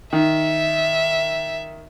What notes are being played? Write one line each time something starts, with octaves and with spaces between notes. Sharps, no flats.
D#3 E5